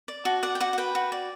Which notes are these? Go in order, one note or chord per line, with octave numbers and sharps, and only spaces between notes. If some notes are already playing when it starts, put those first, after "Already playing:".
D5
F#4 A5
D5 F#5
G5
F#4 F#5
F#5
B4 G5
F#4
D5